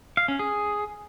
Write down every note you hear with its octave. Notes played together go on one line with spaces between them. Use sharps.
F5
C#4
G#4